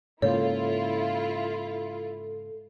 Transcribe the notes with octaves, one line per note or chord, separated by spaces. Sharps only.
G#2 C#3 A#3 E4 F4 A4 C#5